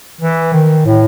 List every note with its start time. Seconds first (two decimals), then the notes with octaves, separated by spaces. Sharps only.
0.21 E3
0.53 D#3
0.85 A2